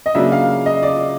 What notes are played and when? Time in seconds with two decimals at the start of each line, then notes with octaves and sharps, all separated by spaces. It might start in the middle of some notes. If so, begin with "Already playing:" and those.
0.06 D#5
0.15 C#3 F#3 A#3 D4 E5
0.32 F5
0.66 D#5
0.83 D5